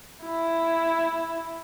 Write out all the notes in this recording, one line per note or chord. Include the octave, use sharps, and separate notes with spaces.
E4